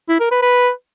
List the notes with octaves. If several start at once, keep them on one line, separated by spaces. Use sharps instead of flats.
E4
A#4
B4
B4